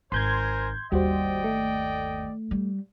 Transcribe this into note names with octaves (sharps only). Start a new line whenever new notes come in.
G#1 A#4 C5 G#5 C6 G6 G#6
G1 D#2 G3 F#4 C5 D5 D#5 G5
A3
G3